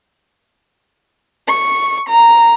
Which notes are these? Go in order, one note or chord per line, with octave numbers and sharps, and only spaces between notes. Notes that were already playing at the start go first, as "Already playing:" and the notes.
C#6
A#5